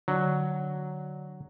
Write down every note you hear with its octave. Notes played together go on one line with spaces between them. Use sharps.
D3 F#3